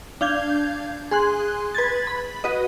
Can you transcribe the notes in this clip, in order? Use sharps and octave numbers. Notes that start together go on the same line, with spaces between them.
D4 F5 G6 G#6
G#4 C6 F#6
B4 G#6 A6
B5
F#4 B4 D#5